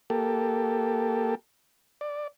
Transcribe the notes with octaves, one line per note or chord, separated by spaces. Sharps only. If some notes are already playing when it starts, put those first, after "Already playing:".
A#3 G4 A4
D5